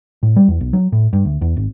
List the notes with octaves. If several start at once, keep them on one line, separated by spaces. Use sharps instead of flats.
A2
G3
E2
B1
F#3
A2
G2
D2
E2
G#1